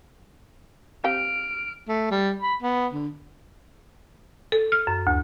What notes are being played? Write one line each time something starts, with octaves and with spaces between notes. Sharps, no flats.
C4 G4 F5 F6 D7
A3
G3
B5
B3
D3
A4
F6
F#2
D2